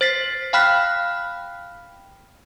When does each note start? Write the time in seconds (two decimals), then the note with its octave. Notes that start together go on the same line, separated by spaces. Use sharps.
0.01 C5 A6 B6 C7
0.53 F5 G5 B5 F6 F#6 B6